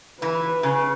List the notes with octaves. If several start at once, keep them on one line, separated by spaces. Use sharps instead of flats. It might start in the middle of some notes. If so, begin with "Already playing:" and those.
E3 B4
C#3